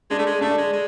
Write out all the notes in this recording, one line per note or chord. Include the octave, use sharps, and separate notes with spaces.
G#3 D4
A3
G#3
A3 D4
G#3
G#3